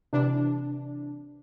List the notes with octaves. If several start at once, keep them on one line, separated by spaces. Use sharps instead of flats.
C3 E3 D4